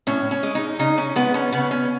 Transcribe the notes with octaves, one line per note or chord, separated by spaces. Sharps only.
A2 C#4
C#4
G#3
D#4
C#3 D#4
C#4
G#3 B3
C#4
C#3 B3
C#4